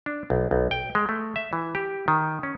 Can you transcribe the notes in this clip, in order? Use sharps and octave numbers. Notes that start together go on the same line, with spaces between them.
D4
B1
B1
G5
G#3
A3
E5
E3
G4
D#3
C#4